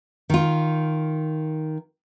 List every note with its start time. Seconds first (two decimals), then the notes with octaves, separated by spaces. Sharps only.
0.30 D#3 F4